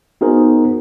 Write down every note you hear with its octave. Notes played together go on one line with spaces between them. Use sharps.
B3 D#4 F#4 G#4 A#4 C5